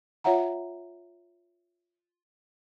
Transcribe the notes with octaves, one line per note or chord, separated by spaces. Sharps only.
F4 C#5 E5 F#5 A#5